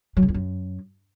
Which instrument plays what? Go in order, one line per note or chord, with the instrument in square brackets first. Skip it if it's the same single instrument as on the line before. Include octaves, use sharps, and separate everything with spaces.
[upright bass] F#3
C#3
E2
F#2